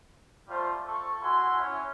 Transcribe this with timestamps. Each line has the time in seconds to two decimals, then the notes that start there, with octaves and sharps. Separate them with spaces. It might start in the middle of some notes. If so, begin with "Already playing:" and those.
0.48 G3 A3 F4 C5
0.85 A4 C#6
1.21 E4 F#4 G#5 C6
1.58 C#4 E4 C#5